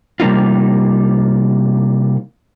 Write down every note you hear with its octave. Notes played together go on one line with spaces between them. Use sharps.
C3 G3 A#3 D#4 F4